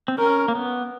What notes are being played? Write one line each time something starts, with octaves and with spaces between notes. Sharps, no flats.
C4
C#4 A#4
A#3
B3